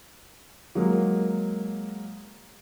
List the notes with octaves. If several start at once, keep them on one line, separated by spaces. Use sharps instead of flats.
F#3 G#3 A#3